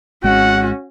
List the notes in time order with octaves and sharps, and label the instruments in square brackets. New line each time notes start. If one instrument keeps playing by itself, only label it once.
[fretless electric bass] G#1 G#3 [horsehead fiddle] C#4 F#4 [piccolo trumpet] F#5